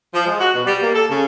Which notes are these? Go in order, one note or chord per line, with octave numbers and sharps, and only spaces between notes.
F3
G#3
F#4
B2
G3
A#3
A4
C#3